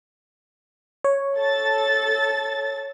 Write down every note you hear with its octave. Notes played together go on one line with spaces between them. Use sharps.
C#5
A4 A6